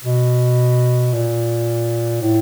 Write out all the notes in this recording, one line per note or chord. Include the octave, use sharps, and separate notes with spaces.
B2
A#2
A2